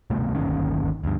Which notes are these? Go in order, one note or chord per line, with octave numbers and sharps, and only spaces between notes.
D1 C2 B2 A3
G1 D#2 D#3 C#4
D2 G2